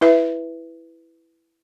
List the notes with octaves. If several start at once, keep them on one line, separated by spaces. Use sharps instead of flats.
E4 B4 E5